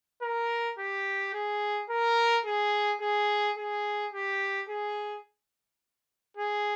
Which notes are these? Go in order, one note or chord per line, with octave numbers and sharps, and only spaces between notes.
A#4
G4
G#4
A#4
G#4
G#4
G#4
G4
G#4
G#4